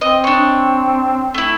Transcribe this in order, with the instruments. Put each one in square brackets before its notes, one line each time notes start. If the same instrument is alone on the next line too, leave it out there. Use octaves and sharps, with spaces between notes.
[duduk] C4 [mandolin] D#5
[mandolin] D4 C#5
A3 E4